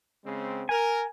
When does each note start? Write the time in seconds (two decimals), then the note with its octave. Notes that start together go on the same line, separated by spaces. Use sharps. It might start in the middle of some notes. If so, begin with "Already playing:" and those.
0.24 C#3 G#3 C4
0.69 A#4 G#5